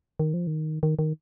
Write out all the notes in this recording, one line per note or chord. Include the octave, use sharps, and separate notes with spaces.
D#3
F3
D#3
D#3
D#3